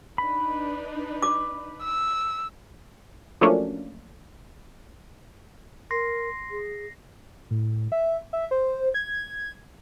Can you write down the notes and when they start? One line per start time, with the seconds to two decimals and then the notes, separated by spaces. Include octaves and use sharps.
0.18 D4 D#4 B4 B5
1.23 D6
1.83 E6
3.41 F3 F#3 A3 A#3 C#4 D4
5.91 A#4 C6 A#6 C7
6.51 G#4
7.51 A2
7.92 E5
8.33 E5
8.51 C5
8.94 G#6